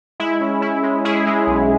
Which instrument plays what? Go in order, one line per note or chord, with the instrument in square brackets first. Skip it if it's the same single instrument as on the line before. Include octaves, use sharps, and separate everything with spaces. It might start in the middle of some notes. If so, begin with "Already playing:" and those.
[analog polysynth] G#3 E4
C#4
C#4 E4
G#3
C#4 E4 G#4
G#3
B1